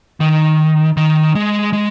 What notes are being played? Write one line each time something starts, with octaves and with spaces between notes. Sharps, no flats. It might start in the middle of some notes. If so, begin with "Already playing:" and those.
D#3
D#3
G#3
G#3